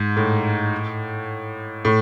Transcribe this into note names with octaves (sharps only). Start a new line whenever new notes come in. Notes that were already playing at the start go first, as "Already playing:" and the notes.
Already playing: G#2
A2
A2